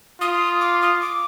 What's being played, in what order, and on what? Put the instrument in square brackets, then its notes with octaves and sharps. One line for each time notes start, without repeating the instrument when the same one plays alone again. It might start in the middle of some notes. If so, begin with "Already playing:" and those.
[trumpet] F4 [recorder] D#6
[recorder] D6
D#6
D6